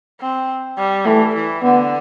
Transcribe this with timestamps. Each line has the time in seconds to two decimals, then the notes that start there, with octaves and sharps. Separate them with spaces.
0.20 C4
0.78 G3
1.05 E3 A3
1.34 E3
1.63 D3 B3